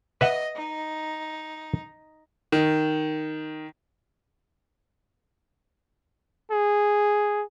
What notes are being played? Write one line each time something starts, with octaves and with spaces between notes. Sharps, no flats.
B4 D#5 E5 F#5
D#4
D#3
G#4